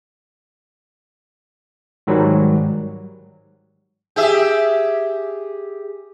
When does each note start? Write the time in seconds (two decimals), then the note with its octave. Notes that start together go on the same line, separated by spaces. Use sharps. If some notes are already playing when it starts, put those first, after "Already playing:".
2.07 G#2 D#3 F#3 G3
4.16 G4 G#4 E5